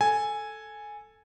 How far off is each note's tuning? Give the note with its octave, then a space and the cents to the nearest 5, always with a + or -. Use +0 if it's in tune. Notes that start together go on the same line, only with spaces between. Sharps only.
A4 +0 G#5 +0